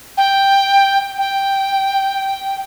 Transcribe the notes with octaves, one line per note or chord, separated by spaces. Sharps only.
G5
G5